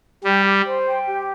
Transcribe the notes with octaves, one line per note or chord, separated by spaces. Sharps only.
G3 G4
G4
C5
G5
G4